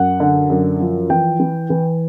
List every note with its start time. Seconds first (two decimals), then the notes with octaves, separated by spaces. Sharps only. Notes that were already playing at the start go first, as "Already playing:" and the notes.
Already playing: F#2 F#5
0.20 D3
0.50 F#2
0.80 F3
1.10 E3 G5
1.40 E3
1.70 E3